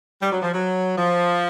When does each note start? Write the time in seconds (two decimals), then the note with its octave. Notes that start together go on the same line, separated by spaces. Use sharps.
0.21 G3
0.31 F#3
0.42 F3
0.53 F#3
0.98 F3